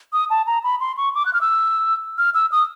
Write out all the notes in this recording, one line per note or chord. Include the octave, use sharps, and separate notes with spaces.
D#6
A5
A#5
B5
C6
C#6
D6
F#6
F6
E6
F6
E6
D#6